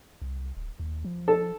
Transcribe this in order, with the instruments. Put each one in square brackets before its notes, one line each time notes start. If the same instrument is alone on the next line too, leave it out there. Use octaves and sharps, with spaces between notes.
[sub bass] C2
D1
D#2
F3
[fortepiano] A4